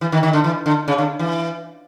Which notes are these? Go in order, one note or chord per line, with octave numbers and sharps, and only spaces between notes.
E3
D#3
D#3
D3
E3
D3
C#3
D3
E3